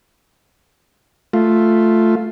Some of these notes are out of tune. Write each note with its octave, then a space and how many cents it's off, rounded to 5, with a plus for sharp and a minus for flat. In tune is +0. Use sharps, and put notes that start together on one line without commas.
A3 +0 F4 +0